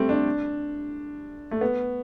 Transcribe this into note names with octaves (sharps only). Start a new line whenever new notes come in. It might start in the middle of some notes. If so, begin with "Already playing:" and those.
Already playing: G3 A3 C4
D4
A3
B3